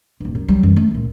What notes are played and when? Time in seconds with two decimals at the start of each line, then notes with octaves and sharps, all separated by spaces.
0.20 D#1 G2
0.35 F#2
0.48 F#3 G3
0.63 F#2 E3
0.76 A3 C#4
0.91 C#2 A#2